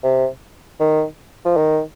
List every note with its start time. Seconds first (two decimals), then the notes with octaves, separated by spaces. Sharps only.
0.04 C3
0.80 D#3
1.45 F3
1.57 D#3